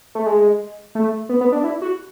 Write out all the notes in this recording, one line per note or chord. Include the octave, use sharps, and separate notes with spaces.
A3
G#3
A3
B3
B3
D4
E4
F#4